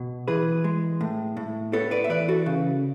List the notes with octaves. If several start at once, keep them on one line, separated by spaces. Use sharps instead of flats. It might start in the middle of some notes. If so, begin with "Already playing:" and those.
Already playing: B2
E3 G#4 B4
G#3
A2
A2
B3 A4 C#5
B4 D5
E5
E3 B4 D5
F#4 A4
C#3